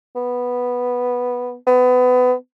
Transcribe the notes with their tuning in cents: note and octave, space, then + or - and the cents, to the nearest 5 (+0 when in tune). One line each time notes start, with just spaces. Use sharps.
B3 -5
B3 +25